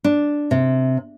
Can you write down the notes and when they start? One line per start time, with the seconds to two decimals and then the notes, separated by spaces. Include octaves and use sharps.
0.04 D4
0.51 C3